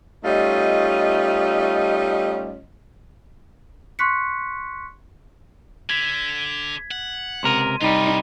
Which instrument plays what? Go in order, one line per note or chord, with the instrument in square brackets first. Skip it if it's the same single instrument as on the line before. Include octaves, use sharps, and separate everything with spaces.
[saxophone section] G3 A3 C#4 D#4 F4 D#5
[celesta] C6 C#6 F#6 B6 C#7
[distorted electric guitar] D3 [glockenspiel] G#6 B6
[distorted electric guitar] F#5
[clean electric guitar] C#2 C3 A#4 [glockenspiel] C6 D#7
[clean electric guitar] C2 G3 [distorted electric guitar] B3 F4 [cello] D#4